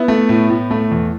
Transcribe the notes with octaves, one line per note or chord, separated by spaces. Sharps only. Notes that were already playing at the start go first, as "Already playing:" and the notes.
Already playing: B3 E4
A3
A2
A2
A3
E2